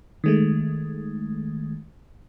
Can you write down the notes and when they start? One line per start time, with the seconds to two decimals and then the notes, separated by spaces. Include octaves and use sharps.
0.24 D#3 G#3 A3